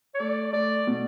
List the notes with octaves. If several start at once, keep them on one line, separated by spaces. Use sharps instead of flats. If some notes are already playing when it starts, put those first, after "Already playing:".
C#5
A3 D5
A3 D5
B2